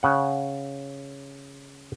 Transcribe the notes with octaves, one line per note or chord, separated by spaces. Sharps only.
C#3 F#5